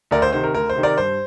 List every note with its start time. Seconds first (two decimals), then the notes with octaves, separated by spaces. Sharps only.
0.11 D2 A#4 D5
0.22 C5
0.33 C3 D#3 C5
0.44 A#4
0.54 D2 A#4
0.69 C5
0.76 C3 D#3
0.83 A#4 D5
0.98 G2 C5